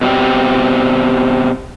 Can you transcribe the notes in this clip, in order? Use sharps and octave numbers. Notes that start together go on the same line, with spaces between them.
B2 G3 C4 G4